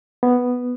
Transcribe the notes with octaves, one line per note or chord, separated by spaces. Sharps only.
B3